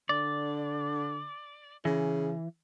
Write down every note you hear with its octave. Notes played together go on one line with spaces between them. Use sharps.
D3 D5
C#3 E3